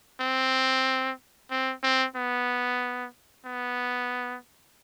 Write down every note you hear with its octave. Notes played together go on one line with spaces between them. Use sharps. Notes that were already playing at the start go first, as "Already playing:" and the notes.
C4
C4
C4
B3
B3